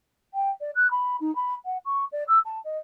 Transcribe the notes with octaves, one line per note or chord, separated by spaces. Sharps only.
G5
D5
F#6
B5
D#4
B5
F#5
C#6
D5
E6
A5
D#5